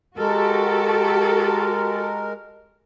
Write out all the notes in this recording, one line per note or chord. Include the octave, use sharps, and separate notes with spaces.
G#3 F#4 G4 A4 A#4